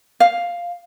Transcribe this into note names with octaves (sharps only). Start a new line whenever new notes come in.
F5